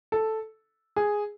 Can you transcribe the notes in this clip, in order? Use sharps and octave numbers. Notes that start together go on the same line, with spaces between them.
A4
G#4